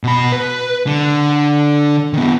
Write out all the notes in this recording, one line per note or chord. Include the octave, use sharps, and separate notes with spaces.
B2 B5
B4
D3
D#3 B3